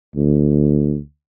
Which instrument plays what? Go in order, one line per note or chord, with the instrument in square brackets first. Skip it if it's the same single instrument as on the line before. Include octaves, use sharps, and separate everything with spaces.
[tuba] D2